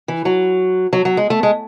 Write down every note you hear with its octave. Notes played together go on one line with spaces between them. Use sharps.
E3
F#3
F#3
F#3
G#3
A3
G#3